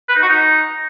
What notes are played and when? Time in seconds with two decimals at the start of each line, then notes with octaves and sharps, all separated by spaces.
0.09 B4
0.15 D#4
0.22 F#4
0.29 D#4